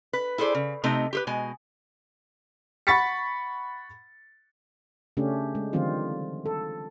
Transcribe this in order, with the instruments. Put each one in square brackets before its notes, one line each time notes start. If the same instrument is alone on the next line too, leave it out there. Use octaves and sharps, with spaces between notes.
[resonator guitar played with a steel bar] B4
E4 G#4 A4 C5 D5
C#3
C3 A3 C4 D#4 D#5
G4 G#4 B4
B2 G#3 G#5
[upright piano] F#5 B5 C#6 A6 B6 C#7
[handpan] C#3 A3 C#4 D4 G4
G#3
D3 D#3 F3 G3 C4 F4
A4